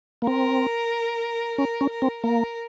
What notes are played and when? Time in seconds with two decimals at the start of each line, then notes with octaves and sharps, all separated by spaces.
0.22 A#3
0.27 C4 A#4
1.58 C#4 A#4
1.81 C#4
1.91 A#4
2.02 C4
2.24 A#3 A#4